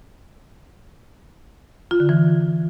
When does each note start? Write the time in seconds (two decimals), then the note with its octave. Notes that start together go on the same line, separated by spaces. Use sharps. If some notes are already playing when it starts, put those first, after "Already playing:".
1.91 F4
2.00 D3
2.09 E3